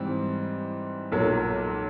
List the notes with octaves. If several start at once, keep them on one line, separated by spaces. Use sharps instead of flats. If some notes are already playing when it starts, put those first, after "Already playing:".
Already playing: G#2 E3 G3 C4
B1 A#2 F#3 A#3